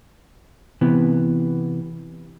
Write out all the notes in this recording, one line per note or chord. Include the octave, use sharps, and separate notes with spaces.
C3 E3 B3